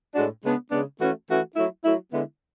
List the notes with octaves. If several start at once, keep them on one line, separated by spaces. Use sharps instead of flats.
A2 G#3 D4 F#4
C#3 G#3 B3 D4
C#3 G#3 B3 D4
E3 A3 C#4 F#4
E3 A3 C#4 F#4
F#3 A3 E4
F#3 A3 E4
D3 G#3 B3 E4